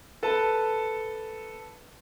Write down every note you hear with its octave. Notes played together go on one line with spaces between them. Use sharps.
A4 B4 A5